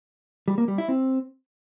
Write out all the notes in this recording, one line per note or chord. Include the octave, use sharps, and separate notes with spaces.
G3
A#3
G3
E4
C4